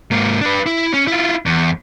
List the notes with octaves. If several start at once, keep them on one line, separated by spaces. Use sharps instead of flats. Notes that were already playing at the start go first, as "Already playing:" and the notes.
G#2 A#3
D4 B4
E4
C#4
E4 F4
E2